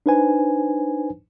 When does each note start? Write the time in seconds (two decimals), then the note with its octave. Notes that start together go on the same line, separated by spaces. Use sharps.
0.06 D4 D#4 B4 C5 G#5